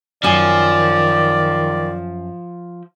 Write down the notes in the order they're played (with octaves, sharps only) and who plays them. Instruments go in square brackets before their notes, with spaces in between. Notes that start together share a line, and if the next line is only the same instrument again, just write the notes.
[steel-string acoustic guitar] F#2 G#5 [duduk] D#3 [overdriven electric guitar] F3 [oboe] D5